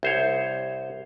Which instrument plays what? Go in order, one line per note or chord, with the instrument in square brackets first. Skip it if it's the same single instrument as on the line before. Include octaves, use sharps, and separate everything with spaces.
[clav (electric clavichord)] C2 C5 C#5